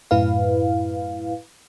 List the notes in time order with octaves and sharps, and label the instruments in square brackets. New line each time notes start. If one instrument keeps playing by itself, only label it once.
[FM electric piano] F#2 A2 E4 B4 F5